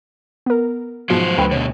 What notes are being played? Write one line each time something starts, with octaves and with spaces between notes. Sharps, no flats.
B3 A#4
G#2 B2 F3 F#3 C5
D2 B4 G5 B5
B2 D3 C#5